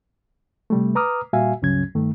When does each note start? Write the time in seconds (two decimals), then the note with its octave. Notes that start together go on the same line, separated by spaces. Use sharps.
0.70 C3 G3 A3
0.95 B4 A#5 D6 D#6 F6
1.33 A#2 G3 F#4 E5 F5 G#5
1.62 C#2 G2 C#3 F#3 C#4 G#6
1.95 G2 D#3 A3